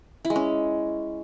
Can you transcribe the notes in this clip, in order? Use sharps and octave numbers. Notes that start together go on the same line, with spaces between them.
E4
G#3
C#4